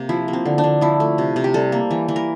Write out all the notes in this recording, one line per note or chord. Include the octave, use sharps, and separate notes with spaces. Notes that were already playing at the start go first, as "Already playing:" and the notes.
Already playing: C3 A#3
F3 E4
A#3
C4
D3
D4
D3
F3 E4
A3
C3
C3
G4
G3 A4
A#3
E3
E3
A#4